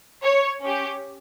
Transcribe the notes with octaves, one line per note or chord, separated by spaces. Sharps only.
C#5
C#4 G4